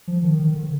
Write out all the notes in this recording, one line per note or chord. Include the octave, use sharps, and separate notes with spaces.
F3
D#3
D#3
D3